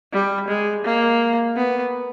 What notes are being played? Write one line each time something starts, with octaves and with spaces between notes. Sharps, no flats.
G3
G#3
A#3
B3